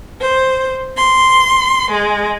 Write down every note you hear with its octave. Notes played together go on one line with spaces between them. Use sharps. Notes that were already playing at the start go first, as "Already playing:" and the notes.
C5
C6
G#3